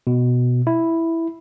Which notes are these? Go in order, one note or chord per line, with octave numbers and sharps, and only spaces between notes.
B2
E4